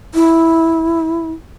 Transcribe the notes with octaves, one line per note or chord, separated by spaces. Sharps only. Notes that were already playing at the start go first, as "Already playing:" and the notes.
E4